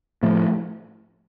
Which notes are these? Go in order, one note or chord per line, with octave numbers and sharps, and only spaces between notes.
A2 F3 A3